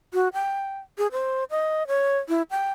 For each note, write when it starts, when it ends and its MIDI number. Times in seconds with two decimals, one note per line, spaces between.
0.14 0.28 66
0.34 0.79 79
0.98 1.07 68
1.12 1.44 72
1.51 1.87 75
1.88 2.18 73
2.29 2.42 64
2.51 2.72 79